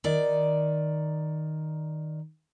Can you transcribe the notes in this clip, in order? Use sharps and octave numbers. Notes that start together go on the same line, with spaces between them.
D#3 D5